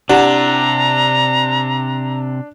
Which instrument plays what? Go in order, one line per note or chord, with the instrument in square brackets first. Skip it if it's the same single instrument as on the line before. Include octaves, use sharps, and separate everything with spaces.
[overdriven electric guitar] C3 [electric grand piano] D4 [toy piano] E4 G4 F#5 [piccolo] A#5